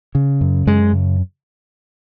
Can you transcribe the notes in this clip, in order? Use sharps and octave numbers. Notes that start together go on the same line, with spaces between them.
C#3
F#2
F#2 G#3
C#3